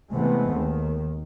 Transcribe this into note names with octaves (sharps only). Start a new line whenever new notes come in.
C3 E3 G#3 A3 B3 C4
D#2 D#3